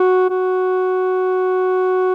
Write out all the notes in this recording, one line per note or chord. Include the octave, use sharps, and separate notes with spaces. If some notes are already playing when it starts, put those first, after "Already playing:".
Already playing: F#4
F#4